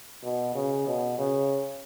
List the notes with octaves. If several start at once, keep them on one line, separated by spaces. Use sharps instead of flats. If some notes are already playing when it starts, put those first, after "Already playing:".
B2
C#3
B2
C#3